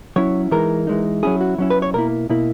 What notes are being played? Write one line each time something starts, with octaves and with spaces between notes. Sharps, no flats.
F#3 C#4 E4 C#5
E3 G#3 D#4 A#4
E3 G#3 D#4
F#3 C#4 E4 G#4
F#4
F#3 C#4 E4
B4
C#5
B2 A#3 E4 A#4
B2 A#3 E4